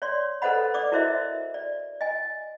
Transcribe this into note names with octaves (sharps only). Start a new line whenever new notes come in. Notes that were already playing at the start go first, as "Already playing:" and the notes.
C#5 D5 C6
A4 B4 C5 D#5 F#5 B5
D5 D6 D#6
E4 F#4 A#4 C5 D#5 E5
D5
D#5 G#5